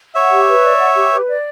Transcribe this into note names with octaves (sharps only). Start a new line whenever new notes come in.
C#5 E5 F#5
G4
B4
D5
F#5
G4
B4
D5